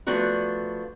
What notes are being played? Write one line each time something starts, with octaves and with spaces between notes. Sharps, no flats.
F3 A3 B3 D4 F#4